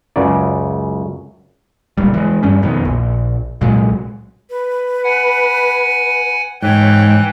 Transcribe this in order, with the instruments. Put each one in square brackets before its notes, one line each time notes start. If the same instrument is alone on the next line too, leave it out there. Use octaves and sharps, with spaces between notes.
[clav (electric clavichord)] C#2 F#2 C#3 D5
[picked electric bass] E1 C#2 A#2 G3
E3 G#3
G2 G3 C#4
F2 B2 D#3
A#1
C2 A#2 F#3 G#3
[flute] B4
[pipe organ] F#5 G#5
[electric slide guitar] G#2 [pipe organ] E3 F#6 [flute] C#5 [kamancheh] G5